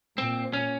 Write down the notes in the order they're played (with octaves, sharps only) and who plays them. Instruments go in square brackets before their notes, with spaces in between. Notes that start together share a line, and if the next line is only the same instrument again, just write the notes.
[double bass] A#2 [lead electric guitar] C4
[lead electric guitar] C#4